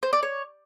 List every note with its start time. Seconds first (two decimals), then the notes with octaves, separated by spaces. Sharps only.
0.03 C5
0.13 D5
0.23 C#5